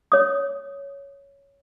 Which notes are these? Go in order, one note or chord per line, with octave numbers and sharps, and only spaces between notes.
C#5 D#6